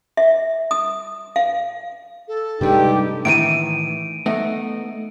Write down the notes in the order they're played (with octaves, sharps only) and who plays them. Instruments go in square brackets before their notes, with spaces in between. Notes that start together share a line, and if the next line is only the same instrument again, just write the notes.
[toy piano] E5
D#6
F5
[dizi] A4
[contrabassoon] G2 [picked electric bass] C3 G3 G#3 [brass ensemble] D#4 G4
[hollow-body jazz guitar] A2 D#3 E3 [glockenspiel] D7 D#7
[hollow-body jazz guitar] A3 B3 D#4